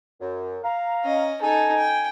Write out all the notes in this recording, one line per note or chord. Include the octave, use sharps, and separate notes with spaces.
F#2
F5 A#5
C#4 D#5
D#4 A4 G#5
G5